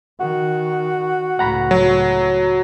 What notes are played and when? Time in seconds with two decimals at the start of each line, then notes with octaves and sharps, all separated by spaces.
0.20 D#3 F#4
1.39 C#2 A2 F#5 A#5 B5
1.71 F#3